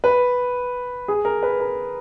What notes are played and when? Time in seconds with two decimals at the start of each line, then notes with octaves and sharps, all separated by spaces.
0.04 B4
1.08 G#4
1.25 A#4
1.43 B4
1.60 A#4